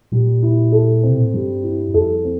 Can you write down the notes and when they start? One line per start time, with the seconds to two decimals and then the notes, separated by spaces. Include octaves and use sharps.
0.12 A#2 G3
0.43 E4
0.72 A4
1.03 C4
1.08 C3
1.18 A#2
1.25 A2
1.33 G2 G3
1.63 E4
1.94 F2 A4
2.24 C4